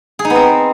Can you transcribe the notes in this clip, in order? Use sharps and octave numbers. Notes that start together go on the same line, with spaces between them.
G#4
D#4
B3
C4